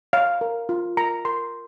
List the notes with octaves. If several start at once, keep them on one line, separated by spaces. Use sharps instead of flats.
C#5 F5
A#4
F4
A#4 A#5
A#4 C6